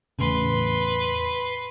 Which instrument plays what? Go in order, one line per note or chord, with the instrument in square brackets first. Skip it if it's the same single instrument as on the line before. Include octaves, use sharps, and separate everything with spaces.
[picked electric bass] E2 A2 C#3 [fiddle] B4 C6